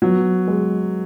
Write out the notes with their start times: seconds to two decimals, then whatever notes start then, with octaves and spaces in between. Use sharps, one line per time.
0.02 F#3 B3
0.47 G#3